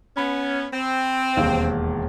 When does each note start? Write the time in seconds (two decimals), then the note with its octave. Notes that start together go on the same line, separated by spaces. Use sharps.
0.17 B3 C#4 B5
0.73 C4
1.36 E1 D#2 F5